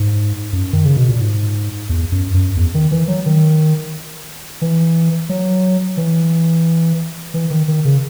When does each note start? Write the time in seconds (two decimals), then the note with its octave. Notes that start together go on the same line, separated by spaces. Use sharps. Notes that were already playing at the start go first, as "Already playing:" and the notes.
Already playing: G#2
0.53 F#2
0.73 D#3
0.85 C#3
0.97 B2
1.09 A#2
1.21 G#2
1.89 E2
2.12 F#2
2.34 F#2
2.56 E2
2.74 D#3
2.91 E3
3.08 F#3
3.26 D#3
4.62 E3
5.29 F#3
5.97 E3
7.34 E3
7.51 D#3
7.68 D#3
7.85 C#3